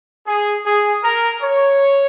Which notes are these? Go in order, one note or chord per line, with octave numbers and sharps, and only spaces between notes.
G#4
G#4
A#4
C#5